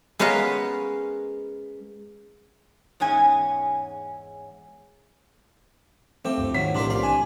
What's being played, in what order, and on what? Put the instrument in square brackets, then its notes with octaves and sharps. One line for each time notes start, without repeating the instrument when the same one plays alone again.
[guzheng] G#3 B3 C#4 A#4 B4 F5
[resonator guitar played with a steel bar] E2 G#2 C#4 G#5
[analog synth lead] F3 [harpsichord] A3 G4 [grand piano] C4
[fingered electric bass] D2 G2
[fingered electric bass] G#2 D#3 G#3 [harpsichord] F#3 [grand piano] B6
[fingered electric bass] B1 F3 [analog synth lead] A2 [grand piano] C3 C6 [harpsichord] D4 F4 A#4
[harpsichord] A1 D5 F5
[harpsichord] D4 [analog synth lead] G#5